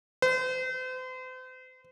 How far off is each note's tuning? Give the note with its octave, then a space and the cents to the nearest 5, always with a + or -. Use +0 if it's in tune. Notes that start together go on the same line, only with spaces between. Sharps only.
C5 -40